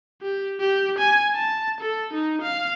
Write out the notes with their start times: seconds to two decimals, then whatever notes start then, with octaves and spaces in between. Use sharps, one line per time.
0.22 G4
0.60 G4
0.99 G#5
1.33 A5
1.81 A4
2.14 D#4
2.42 F5